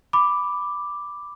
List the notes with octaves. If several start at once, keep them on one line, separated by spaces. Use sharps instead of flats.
B5 D6